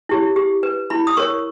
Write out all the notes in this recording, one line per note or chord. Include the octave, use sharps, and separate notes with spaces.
E4 G4 C#5
G4
B4
E4 B5
D#6
A#4 C#5 C#6